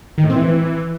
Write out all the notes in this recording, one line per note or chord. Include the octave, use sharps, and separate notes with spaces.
D#3
A2
C4
E3